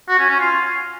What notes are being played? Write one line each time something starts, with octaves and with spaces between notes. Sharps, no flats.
F#4
C#4
C#4
F4